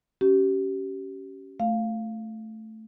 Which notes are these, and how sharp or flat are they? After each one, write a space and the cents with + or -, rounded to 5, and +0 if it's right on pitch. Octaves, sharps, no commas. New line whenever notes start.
C#4 +0 G4 -30
A3 +0 F5 +0